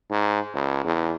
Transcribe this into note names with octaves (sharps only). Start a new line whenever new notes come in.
G#2
C#2
E2